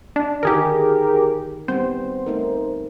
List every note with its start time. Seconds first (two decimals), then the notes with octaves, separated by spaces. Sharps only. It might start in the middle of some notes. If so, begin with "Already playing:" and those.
0.16 D4
0.43 D3 D#3 D#4 G4 G#4 A#4
1.68 G3 B3 C4 C5
2.26 A3 D#4 A#4